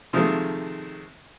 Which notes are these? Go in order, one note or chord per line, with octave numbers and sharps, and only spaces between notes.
C3 D#3 F3 G#3 A3